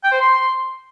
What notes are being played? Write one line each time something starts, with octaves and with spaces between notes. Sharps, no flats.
G5
C5
C6